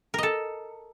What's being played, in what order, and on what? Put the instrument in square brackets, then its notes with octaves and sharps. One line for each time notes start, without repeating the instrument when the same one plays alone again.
[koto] A#4
D#5
A4